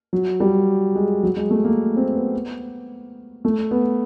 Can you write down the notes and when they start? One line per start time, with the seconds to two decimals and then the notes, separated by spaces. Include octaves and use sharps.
0.13 F#3
0.40 G3
0.95 G#3
1.23 F#3
1.37 G#3
1.51 A3
1.65 A#3
1.97 C4
2.15 B3
3.45 A3
3.71 B3